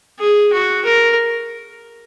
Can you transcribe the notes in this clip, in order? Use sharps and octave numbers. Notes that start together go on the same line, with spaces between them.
G#4
F#4
A#4